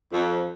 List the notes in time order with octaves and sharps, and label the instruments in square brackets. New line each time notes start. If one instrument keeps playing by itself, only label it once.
[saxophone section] F2